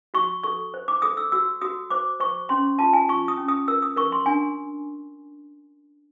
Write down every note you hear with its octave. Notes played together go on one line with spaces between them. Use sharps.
F#4 C#6
A4 C#6
C5
D6
A4 D#6
E6
F#4 E6
F#4 D#6
C5 D6
C5 C#6
C#4 C6
F4 A5
G#5
F4 C#6
D#6
C#4
D#6
A#4 E6
D#6
A#4 C#6
C6
D4 G#5